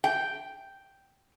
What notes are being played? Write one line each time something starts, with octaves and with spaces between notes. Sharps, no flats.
G5